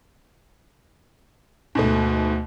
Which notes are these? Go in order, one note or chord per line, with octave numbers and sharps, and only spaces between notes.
D2 G#2 B2 A3